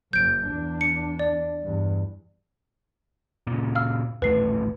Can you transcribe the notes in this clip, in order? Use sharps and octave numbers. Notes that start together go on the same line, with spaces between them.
F#1 F#2 G6 D7
E2 D4
C#7
D5
E2 G2
A#2 C#3
F5 E6 F6
D#1 A1 A3 B4 C7